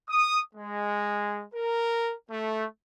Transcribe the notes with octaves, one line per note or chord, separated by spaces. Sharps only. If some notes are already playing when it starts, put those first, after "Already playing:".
D#6
G#3
A#4
A3